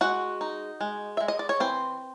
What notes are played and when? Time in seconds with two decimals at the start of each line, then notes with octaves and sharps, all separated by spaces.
0.01 G#3 F#4 F#5
0.41 D#4
0.81 G#3
1.17 G#3 E5
1.28 D#5
1.39 D5
1.49 C#5
1.60 E3 C4 C5